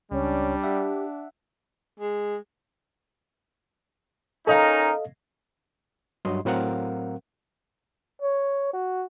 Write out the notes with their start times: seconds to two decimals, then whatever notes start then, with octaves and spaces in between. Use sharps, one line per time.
0.12 C#2 G3 C#4 D4
0.63 G4 E5 F#5
2.00 G#3
4.47 C#4 D#4 A4 A#4 D#5 F5
6.25 G2 F#3 D#5 C6
6.45 A2 F#3 C4 A#4 F5 F#5
8.22 C#5
8.73 F#4